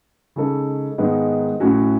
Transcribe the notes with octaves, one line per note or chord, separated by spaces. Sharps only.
C#3 G#3 D#4 A4
G#2 D#3 G#3 B3 D#4
A2 F#3 C#4 F#4